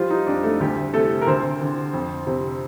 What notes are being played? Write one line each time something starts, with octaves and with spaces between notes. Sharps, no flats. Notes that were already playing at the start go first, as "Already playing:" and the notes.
Already playing: F3 G3 F4
D#4
F2 D4
A3 A4
D2 G3 G4
C3 A3 A4
A#4
D2 C4 C5
D3
F2
C3